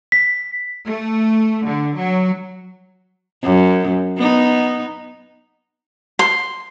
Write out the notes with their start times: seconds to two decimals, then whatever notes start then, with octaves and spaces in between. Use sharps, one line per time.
0.12 B6
0.85 A3
1.66 D3
1.96 F#3
3.43 F#2
4.17 B3 D#4
6.19 C6